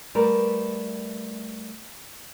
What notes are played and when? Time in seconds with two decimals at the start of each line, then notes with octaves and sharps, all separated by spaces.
0.15 G3 A3 A#4 B4